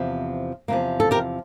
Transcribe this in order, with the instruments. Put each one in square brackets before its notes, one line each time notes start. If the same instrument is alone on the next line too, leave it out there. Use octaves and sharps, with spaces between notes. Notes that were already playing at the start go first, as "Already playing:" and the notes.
Already playing: [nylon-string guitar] E2 C3 F3
E2 C3 F3 A#3
A4
G4 A#4